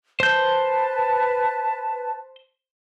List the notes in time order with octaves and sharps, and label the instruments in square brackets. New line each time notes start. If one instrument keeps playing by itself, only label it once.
[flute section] B4 A5 [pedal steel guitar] C5 G6